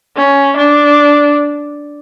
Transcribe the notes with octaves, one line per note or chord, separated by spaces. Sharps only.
C#4
D4